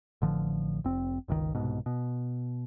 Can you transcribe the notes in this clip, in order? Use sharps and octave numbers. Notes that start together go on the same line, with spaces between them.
A1 D3 F3
F1 C4
G1 C#2 B2 D#3
C2 G#2 B2
B2